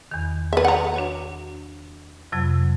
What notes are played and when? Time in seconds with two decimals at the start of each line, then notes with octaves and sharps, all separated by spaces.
0.11 E2 D#3
0.53 B4 E5
0.65 F#5 A#5
0.94 D4 F#4 C#5
2.32 F2 C3 F#3